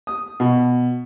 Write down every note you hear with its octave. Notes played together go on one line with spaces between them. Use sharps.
D#6
B2